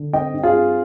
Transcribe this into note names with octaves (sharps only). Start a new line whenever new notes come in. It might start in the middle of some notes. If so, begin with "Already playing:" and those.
Already playing: D3
C4 D#5 G5
G2
F4 G#4
C4